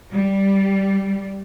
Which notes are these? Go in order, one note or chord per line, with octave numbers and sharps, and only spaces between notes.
G3